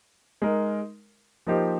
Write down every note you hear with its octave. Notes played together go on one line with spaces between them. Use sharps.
G#3 D#4 A#4
F3 A#3 D#4 G4 C5